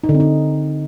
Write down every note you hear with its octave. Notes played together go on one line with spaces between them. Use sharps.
D#4
D3
C4
D#4